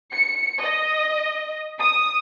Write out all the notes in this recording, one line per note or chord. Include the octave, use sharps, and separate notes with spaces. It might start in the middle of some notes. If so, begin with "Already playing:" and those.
C#7
D#5
D#6